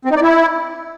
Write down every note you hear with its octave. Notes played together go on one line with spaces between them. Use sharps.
C4
D#4
D5
E4